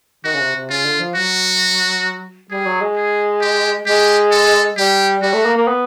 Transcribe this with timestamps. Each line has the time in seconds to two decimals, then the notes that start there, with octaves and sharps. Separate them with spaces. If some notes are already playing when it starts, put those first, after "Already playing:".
0.24 D#3 F#4
0.34 C#3
0.40 C3
0.55 C3
0.69 C#3 F4
0.85 D3
0.99 F3
1.15 F#3 F#4
2.50 G3 G#4
2.66 F#3
2.81 G#3
2.96 G#4
3.41 G4
3.86 G#3 G4
4.31 A4
4.76 G3 G4
5.22 G3 F#4
5.33 A3
5.45 A#3
5.57 A#3
5.68 B3